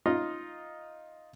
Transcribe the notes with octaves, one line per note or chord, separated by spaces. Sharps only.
D#4 F4 D#5